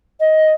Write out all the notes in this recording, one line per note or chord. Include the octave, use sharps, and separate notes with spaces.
D#5